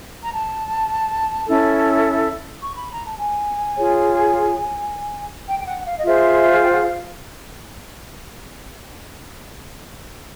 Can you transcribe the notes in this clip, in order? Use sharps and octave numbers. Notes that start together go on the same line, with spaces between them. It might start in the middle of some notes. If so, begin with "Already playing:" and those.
A#5
A5
C#4 E4 A4
C#6
B5
A#5
A5
G#5
F4 G#4 C#5
G5
G5
F#5
F#5
F5
D#5
F4 G#4 C5 E5
G5
F#5
F5